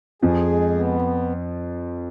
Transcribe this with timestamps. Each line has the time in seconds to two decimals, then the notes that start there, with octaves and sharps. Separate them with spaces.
0.22 F2 F3 G#4
0.49 G#3
0.74 B3